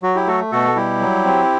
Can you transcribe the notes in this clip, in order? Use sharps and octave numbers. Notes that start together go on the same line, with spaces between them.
F#3 F#4
E4 G4
A3 F#4 A4
B2 F#4 A4
G3 E4 G4
F#3
C4